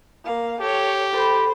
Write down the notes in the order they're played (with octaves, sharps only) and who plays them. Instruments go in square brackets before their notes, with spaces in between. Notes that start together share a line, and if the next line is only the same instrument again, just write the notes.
[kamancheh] A#3 F5
[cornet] G4 [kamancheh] A4 C#5
[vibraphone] A4 B5 [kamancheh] C5